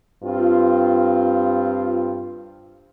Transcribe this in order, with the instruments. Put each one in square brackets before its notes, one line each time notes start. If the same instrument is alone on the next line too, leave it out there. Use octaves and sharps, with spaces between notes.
[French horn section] G2 C4 F4